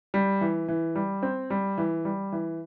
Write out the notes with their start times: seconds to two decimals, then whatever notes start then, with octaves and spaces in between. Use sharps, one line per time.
0.14 G3
0.41 E3
0.68 E3
0.96 G3
1.23 C4
1.50 G3
1.78 E3
2.05 G3
2.32 E3